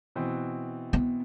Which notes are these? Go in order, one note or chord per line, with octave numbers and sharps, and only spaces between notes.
B2 E3 C4
B3